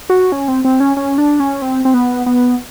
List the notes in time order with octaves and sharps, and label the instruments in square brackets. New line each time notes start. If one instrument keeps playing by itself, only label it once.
[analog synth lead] F#4
C#4
C4
C4
C#4
C#4
D4
C#4
C4
C4
B3
B3